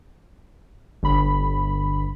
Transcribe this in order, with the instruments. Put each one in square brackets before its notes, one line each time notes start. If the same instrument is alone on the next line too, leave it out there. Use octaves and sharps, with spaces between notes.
[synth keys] G1 B5